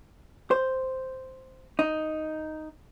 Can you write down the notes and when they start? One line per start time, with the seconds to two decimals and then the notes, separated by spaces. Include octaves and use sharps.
0.51 C5
1.79 D#4